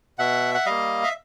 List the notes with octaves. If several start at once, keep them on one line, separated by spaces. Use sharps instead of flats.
B2 E5 F#5
F#5
G3 A#3 D#5 F5
E5